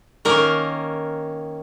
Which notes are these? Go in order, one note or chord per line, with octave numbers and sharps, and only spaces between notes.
D#3 A#3 C#4 A#4